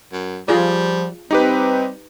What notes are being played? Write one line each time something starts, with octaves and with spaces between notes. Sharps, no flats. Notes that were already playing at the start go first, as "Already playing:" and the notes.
F#2
F3 G3 F4 G#4 D5
G3 C4 D#4 G4 B4